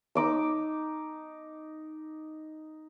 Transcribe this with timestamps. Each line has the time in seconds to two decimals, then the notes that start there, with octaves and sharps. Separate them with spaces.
0.15 D#4 D6 E6